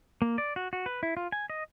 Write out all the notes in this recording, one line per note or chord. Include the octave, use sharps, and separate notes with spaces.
A#3
D5
F#4
F#4
B4
E4
F4
G#5
D#5